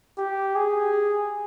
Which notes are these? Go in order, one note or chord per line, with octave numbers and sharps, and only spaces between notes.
G4
G#4